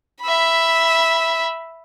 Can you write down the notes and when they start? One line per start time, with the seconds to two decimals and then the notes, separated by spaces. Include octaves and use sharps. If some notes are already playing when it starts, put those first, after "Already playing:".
0.22 E5 B5